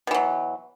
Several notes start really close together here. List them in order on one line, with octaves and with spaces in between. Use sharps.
B2 E3 F#3